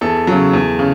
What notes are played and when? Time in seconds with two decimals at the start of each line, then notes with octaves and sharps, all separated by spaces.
0.01 E2 A4
0.27 C#3 F#3
0.53 E2
0.79 C#3